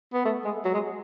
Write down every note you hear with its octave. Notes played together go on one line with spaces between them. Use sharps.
B3
A3
G#3
F#3
G#3